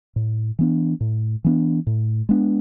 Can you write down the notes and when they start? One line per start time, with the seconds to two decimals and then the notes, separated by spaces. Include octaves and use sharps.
0.16 A2
0.59 E3 B3 D4
1.01 A2
1.44 E3 B3 D4
1.87 A2
2.29 G#3 B3 D4